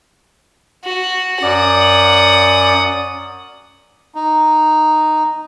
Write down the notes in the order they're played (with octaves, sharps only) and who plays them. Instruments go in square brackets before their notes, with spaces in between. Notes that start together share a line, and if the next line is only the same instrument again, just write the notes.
[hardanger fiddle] F#4
[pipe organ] F#2 D5 [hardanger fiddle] F#5 D#6
[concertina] D#4